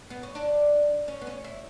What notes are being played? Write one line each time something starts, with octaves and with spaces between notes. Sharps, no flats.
B3
C#4
D4
C#4
B3
C#4
E4